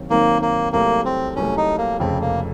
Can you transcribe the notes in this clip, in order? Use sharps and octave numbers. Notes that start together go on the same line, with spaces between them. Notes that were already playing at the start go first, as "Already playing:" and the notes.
Already playing: D#2 D#3 F#3 C4
D#2 D#3 F#3 A#3 C4
A#3
C2 C3 F#3 A3 A#3
C4
C2 C3 F#3 A3 C#4
D#4
A#3
F1 F2 C#3 C4
A#3